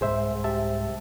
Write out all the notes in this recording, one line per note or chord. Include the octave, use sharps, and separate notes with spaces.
C2 G#2 G#4 C5 E5
G4 E5 A5